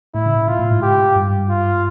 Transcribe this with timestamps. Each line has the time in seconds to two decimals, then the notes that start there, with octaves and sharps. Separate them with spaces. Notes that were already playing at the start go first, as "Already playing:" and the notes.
0.14 A2 E4
0.26 C#3
0.37 B2
0.48 B2 F4
0.59 A2
0.71 G#2
0.82 G4
1.16 G2
1.49 F4